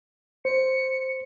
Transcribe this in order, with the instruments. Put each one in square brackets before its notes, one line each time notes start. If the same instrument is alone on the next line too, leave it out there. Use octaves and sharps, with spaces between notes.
[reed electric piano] C5 [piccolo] C#7